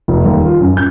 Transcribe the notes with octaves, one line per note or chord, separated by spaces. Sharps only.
F1
D#2
F4
F#2
G6